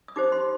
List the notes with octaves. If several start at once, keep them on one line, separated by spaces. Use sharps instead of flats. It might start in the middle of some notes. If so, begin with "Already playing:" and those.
D#6
D#4 G4 C5 D6
C6